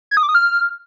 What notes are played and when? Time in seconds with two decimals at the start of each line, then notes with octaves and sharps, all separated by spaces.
0.11 G#6
0.17 D#6
0.23 D6
0.29 D#6
0.35 F6